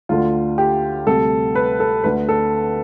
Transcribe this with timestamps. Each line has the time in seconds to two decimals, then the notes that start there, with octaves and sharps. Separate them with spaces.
0.09 D2 D3 A3 F4
0.58 G4
1.07 D2 C3 G3 A4
1.55 B4
1.80 A4
2.04 D2 D3 A3 B4
2.29 A4